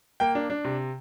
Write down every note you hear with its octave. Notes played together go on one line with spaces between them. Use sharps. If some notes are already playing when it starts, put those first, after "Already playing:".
A#3 G5
D4
D4
C3